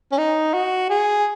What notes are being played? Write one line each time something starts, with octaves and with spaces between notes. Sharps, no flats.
C#4
D#4
F#4
G#4